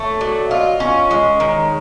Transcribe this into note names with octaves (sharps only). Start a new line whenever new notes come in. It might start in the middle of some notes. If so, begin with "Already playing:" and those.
Already playing: A3 C#5
F#3 D5
F4 D#5
C#4 C#5
G#3
D#3